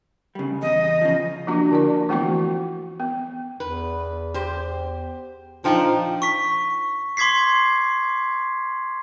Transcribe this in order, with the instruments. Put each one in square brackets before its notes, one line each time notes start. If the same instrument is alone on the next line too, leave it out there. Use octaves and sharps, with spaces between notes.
[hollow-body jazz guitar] C#3 G3
[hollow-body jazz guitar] E2 [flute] D#5
[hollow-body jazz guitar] C#3 F3
[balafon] F3 A#3 D4 F4 F#4
D3 E4 D5
E3 A3 B3 F4 F#4 C#6
B3
[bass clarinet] E2 [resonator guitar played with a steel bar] B4
[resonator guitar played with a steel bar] G4 C5
[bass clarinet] A#2 [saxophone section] F3 [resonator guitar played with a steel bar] D4 D#4 G5
[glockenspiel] C#6 B6
C6 D6 G#6 B6 C7